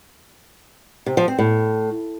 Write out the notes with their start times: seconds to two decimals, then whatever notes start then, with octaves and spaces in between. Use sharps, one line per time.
1.06 C3
1.17 F3
1.28 C4
1.38 A2